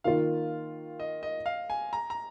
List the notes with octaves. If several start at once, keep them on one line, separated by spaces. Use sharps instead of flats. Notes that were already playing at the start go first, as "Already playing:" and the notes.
D#3 A#3 F4 F5
D#5
D#5
F5
G#5
A#5
A#5